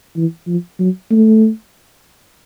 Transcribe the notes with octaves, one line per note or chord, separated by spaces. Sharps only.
E3
F3
F#3
A3